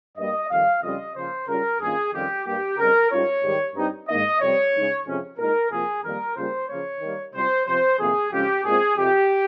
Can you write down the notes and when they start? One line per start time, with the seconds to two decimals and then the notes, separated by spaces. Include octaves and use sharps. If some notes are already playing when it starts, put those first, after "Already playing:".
0.18 G2 G3 A#3 D#5
0.51 F2 D#3 G3 F5
0.83 F2 C#3 G3 C#4 F4 D#5
1.15 C#3 F3 A#3 C5
1.48 C#3 G3 C#4 F4 A#4
1.80 G2 D#3 A#3 C#4 F4 G#4
2.13 F2 D#3 G3 C#4 F4 G4
2.45 G2 G3 A#3 G4
2.78 C#3 G3 C4 D#4 A#4
3.11 G#2 G3 C#4 F4 C#5
3.43 G#2 D#3 G3
3.76 G2 G3 C4 D#4
4.08 G#2 D#3 A#3 D#4 D#5
4.41 F2 C3 G3 C4 C#5
4.73 C#3 G#3 D#4
5.06 F2 C3 F3 G#3 C#4
5.38 A#2 G#3 D#4 A#4
5.71 C3 F3 A#3 F4 G#4
6.04 F2 D#3 G3 A#3 A#4
6.36 C#3 G3 A#3 F4 C5
6.68 C#3 F3 A#3 C#5
7.01 D#3 G3 A#3
7.35 C3 G3 C4 F4 C5
7.67 C3 F3 C4 C5
7.99 F2 C3 D#3 A#3 G#4
8.32 F2 C#3 G#3 C#4 F4 G4
8.64 A#2 G#3 C4 F4 G#4
8.97 F2 C3 F3 G4